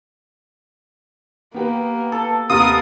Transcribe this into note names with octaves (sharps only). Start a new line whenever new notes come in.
A#3 B3 G4 B4
A4
D#2 C3 B3 F4 A#4 D#6